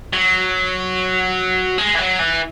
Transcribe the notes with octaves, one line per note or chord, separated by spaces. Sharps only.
F#3
G#3
E3
F#3
E3